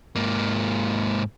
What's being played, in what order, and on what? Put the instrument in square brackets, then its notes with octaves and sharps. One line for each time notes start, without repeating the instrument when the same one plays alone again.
[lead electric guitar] G#2 A#3